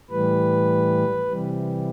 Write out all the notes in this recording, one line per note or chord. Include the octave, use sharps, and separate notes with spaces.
A2 E3 G3 B4
C3 E3 G3